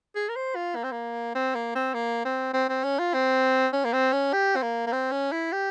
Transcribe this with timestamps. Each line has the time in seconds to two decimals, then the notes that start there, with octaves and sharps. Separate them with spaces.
0.16 G#4
0.29 A#4
0.36 C5
0.56 F4
0.76 A#3
0.84 C4
0.92 A#3
1.35 C4
1.55 A#3
1.75 C4
1.94 A#3
2.25 C4
2.54 C4
2.69 C4
2.84 C#4
2.99 F4
3.14 C4
3.73 C#4
3.85 A#3
3.94 C4
4.13 C#4
4.33 G4
4.56 C4
4.63 A#3
4.87 A#3
4.93 C4
5.12 C#4
5.32 E4
5.52 G4